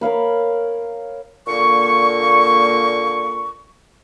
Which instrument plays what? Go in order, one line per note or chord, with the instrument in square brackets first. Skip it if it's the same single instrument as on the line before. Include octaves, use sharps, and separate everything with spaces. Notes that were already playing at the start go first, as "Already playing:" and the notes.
[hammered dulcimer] A#4 C#5 F5 B5
[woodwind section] A#2 D3 A#3 C#6